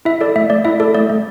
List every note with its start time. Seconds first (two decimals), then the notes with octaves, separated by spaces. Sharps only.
0.05 E4 E5
0.21 A4 D5
0.36 A3 E5
0.50 A3 D5
0.65 E4 E5
0.80 A4 D5
0.94 A3 D5
1.10 A3